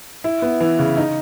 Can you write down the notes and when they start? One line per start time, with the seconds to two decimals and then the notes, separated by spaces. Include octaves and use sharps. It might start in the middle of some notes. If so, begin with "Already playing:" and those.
0.24 E4
0.42 B3
0.60 E3
0.79 C#3
0.97 D#4